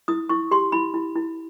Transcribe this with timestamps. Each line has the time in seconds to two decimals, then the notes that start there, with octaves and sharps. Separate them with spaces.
0.08 E4 D#6
0.29 E4 C#6
0.51 G4 C6
0.72 E4 B5
0.94 E4
1.15 E4